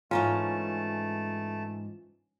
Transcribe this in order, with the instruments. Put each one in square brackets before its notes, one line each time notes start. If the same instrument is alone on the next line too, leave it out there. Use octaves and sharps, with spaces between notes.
[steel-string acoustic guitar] G#2 E3 A#5 [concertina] A3 A5 [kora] C#4 [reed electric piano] F4